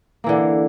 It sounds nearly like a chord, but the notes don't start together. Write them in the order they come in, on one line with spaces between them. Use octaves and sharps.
A#3 E3 D3